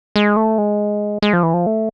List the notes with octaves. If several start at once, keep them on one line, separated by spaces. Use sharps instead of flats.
G#3
A3
G#3
G#3
F3
E3
F3
A3